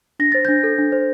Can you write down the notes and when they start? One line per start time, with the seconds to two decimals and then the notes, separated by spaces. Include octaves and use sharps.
0.19 D4 A#6
0.32 C5 A6
0.45 D4 G6 A#6
0.63 A4
0.79 D4
0.92 C5